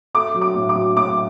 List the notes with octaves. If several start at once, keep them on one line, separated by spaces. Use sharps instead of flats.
A3 D6
F#3
D6
A2
D6
F#3
A2 D6